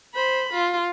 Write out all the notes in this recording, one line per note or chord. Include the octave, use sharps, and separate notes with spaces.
C5 B5
F4